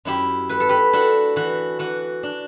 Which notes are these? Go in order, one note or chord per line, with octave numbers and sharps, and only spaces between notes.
F#2 E4 G4
A3 B4
A4
G4 B4
D4 F#4 A4
E3 F#4
E3 F#4
D4